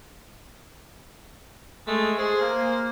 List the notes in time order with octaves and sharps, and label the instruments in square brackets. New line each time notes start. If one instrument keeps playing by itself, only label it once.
[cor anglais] G#3 [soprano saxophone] A3
[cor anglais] G#4 [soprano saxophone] C5
[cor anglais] A#3